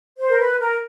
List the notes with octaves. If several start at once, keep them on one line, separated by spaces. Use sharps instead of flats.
C5
A#4
B4
A#4